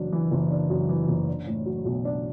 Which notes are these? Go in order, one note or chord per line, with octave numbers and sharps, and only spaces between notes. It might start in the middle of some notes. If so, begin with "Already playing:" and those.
Already playing: F#1 F#2 E3 D4
E3
F#1
D4
F#2
E3
F#1
D4
A2
F#3
B1
D4